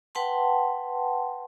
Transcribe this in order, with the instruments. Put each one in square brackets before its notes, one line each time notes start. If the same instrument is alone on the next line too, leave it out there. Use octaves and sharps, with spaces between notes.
[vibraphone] B4 F#5 G5 A5 C6